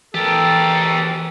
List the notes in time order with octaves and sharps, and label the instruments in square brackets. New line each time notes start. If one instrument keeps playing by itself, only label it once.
[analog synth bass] E3 [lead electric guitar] G4 A#4 [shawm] A4